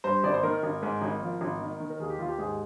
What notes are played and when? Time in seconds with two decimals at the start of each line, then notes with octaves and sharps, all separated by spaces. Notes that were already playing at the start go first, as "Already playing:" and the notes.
0.04 G2 C5
0.24 G#1 D5
0.34 C5
0.43 D#3 A#4
0.63 G#1
0.82 G#2
1.02 G#1
1.22 F3
1.41 G#1
1.60 D#3
1.80 D#3
1.90 A#4
2.00 D#2 G#4
2.10 G4
2.19 D#2 F4
2.29 G4
2.39 G#2 G#4